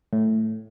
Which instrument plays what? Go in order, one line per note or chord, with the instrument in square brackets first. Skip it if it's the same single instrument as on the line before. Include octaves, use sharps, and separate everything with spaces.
[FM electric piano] A2